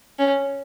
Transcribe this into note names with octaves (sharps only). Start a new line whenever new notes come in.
C#4